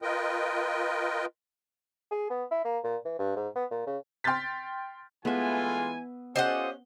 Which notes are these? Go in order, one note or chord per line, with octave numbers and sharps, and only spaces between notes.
F4 A#4 B4 D#5 G5
G#4
B3
E4
A#3
A#2
E3
G2
G#2
B3
A#2
C#3
G5 C6 F6 G6 A6 B6
E3 G#3 A3 B3 F4 E5 G#5
C#4 F4 G4 A4 C5 D5 D#5 F#5